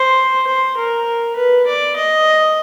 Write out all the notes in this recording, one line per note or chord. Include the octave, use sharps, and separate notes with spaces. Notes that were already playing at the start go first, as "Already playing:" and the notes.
Already playing: C5
C5
A#4
B4
D5
D#5